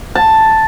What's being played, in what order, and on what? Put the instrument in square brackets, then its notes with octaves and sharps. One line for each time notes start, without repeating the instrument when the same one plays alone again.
[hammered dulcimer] A5